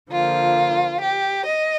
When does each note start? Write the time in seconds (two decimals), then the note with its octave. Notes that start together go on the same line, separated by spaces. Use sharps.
0.11 D3 F3 A#3 F4
1.00 G4
1.45 D#5